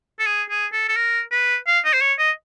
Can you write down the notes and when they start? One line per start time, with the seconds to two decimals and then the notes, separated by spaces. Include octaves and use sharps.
0.19 A4
0.26 G#4
0.50 G#4
0.73 A4
0.89 A4
0.96 A#4
1.31 B4
1.67 F5
1.85 D#5
1.93 C5
2.01 C#5
2.19 D#5